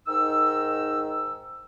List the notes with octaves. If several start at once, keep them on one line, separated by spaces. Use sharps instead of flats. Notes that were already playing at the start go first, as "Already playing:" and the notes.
G#2 D#3 D#4 E6